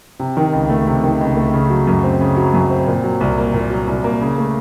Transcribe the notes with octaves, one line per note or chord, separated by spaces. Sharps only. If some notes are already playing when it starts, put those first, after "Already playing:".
C3
D#3
C#2
A3
C3
D#3
C#2
A3
C#3
F#3
F#2
C4
C#3
F#3
F#2
C4
A#2
F#3
C2
A#3
A#2
F#3
C2
A#3
C#3
A3